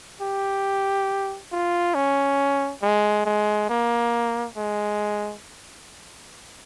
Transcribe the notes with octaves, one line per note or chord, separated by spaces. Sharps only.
G4
F4
C#4
G#3
G#3
A#3
G#3